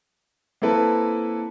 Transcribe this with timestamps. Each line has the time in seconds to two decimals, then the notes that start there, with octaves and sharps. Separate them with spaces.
0.62 A#3 C4 E4 A4 B4